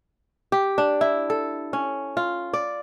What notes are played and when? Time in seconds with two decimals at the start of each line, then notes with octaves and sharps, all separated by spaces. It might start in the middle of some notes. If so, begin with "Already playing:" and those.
0.52 G4
0.78 D4
1.01 E4
1.30 A4
1.73 C#4
2.17 F4
2.53 D5